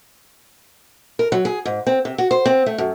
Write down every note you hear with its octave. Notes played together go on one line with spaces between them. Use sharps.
A#4
F#3
G#4
G#2
C4
C3
F#4
C5
C4
A3
F#2